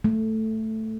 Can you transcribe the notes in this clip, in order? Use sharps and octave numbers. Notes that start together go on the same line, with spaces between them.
A3